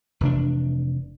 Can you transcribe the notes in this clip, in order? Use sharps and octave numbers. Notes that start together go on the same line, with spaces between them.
F1 E3 C4 D4